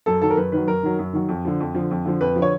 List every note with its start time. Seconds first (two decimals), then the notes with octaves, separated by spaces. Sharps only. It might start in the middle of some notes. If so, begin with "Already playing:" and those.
0.06 F#2 A4
0.22 D#3 F#3 A4
0.30 A#4
0.37 F#2 B4
0.52 D#3 F#3 B4
0.67 F#2 A#4
0.83 D#3 F#3
0.99 F#2
1.13 D#3 F#3
1.29 F2
1.45 D3 F3
1.60 F2
1.75 D3 F3
1.91 F2
2.05 D3 F3
2.21 F2 B4
2.36 D3 F3
2.42 C#5